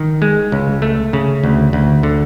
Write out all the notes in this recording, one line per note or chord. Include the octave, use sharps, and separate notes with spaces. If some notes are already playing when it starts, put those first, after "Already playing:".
Already playing: D#3
G#3
C#2
A3
C#3
D2
D2
D3